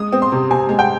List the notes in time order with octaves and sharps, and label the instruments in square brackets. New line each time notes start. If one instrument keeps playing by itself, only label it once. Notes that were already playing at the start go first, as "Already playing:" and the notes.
Already playing: [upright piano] G#3 D#6
C4
C6
C3
C3 G#5
G#3
G5